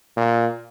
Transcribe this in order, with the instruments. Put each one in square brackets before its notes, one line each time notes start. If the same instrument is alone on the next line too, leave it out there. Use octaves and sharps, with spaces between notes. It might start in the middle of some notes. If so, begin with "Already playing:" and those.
[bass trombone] A#2